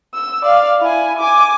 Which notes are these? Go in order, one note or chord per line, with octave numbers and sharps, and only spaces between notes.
E6
D5 F5
E4 G#5
G#5 D6